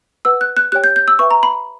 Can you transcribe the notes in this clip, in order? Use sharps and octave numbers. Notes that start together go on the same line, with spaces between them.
B4 F#5 E6
F#6
F#6
G4 C#5 G5 F#6
G6
G6
E6
B4 E5 G5 C#6
A#5
B5